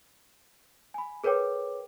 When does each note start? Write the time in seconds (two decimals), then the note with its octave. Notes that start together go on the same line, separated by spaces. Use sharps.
0.94 G#5 B5
1.24 G#4 A#4 B4 C#5 G5 D6